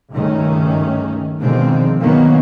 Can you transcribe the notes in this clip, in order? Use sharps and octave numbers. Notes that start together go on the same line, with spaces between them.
C#2 G2 D#3 A3 C#4
B2 D3 D#3 F3 G#3 C4
D#3 F#3 A#3 B3 C#4